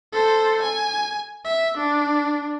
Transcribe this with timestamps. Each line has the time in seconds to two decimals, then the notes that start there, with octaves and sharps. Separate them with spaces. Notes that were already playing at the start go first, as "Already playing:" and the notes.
0.13 A4 C5
0.62 G#5
1.44 E5
1.77 D4